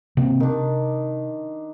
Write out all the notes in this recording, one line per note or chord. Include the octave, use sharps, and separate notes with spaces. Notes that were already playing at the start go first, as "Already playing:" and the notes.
C3 A#3 C4
C3 D#3 D4